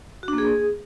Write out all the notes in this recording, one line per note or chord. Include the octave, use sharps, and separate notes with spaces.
F#4
D4
A#3
G#4